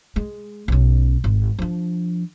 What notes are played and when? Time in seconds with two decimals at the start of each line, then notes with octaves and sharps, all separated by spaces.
0.16 G#3
0.68 B1 C#4
1.24 G#1
1.59 F3 D4